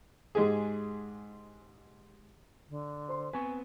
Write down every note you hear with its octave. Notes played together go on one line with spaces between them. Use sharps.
G#2 G#3 G4 G#4
D3
C5 C6
B3 C4 B4 G#5 C#6